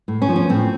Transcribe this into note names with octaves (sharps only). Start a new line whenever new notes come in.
A2
C#4
F3
C#4
A2 C4